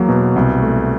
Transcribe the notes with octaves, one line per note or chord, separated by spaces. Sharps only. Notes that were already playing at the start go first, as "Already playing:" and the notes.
Already playing: E2 F#3 A#3
B2
C2
A3